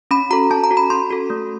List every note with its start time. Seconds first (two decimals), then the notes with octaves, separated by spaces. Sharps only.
0.11 C#4 B5
0.31 F#4 A4 A#5
0.50 C#4 A5
0.64 A#5
0.71 F#4 A4
0.77 B5
0.90 C#4 C6
1.10 F#4 A4
1.30 A3